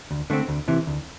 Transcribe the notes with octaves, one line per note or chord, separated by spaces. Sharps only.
D2
D3 A3 C4
D2
C3 E3
D2